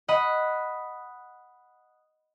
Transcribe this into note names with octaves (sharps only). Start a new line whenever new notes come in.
D#5 F#5 B5